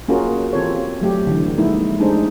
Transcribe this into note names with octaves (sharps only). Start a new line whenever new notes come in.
A#3 C#4 F4 F#4 G#4 A#4
E3 C4 F4 G4 A4 C#5
F#3 A3 G4
D3 E3
F3 G#3 A#3 D#4 E4
G#3 A3 D4 D#4 G#4 C5